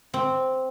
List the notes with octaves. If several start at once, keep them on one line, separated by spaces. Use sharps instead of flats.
C4